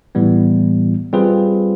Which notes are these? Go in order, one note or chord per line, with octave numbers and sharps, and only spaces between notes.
A2 E3 G3 B3
G3 C4 F4 G#4 B4